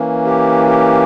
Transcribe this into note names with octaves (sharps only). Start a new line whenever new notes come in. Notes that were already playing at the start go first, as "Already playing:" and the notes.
Already playing: E3 A#3 C#4
G4
G4